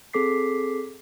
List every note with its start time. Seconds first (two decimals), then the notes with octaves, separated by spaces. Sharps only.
0.13 C4 G#4 A4 D6 B6 C7